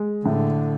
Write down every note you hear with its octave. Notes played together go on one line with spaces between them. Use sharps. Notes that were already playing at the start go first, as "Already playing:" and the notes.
Already playing: G#3
A2 D3